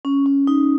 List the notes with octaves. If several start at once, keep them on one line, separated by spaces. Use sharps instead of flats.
C#4
C#4
D#4